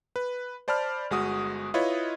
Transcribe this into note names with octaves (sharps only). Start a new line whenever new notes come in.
B4
C5 D5 A5 B5 F6
G1 G#3 F#4 D#6
E4 F4 B4 C#5 D#5